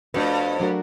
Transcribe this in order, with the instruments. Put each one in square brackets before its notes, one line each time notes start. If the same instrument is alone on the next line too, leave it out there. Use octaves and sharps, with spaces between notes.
[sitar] F2 [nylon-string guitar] A3 D4 F#4 B4
[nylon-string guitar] F#3 A3 D4 F#4 A#4